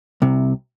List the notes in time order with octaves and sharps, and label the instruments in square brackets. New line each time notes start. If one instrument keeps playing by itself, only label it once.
[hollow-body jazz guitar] C2 C3